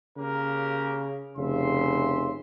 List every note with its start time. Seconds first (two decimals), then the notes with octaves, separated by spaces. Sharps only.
0.18 C#3 A#3 G4 A#4
1.37 F1 C#3 E5 C6